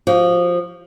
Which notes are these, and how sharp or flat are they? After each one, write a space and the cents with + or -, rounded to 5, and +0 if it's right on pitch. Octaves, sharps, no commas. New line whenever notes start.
F3 +10 F#4 +45